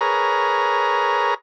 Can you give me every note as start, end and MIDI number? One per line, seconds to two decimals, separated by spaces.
0.01 1.34 68
0.01 1.34 70
0.01 1.34 71
0.01 1.34 73
0.01 1.34 82